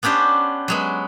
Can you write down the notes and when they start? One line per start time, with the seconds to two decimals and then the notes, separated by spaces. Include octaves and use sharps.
0.03 B3 C#4 D4 G4 C5
0.68 F#3 G#3 B3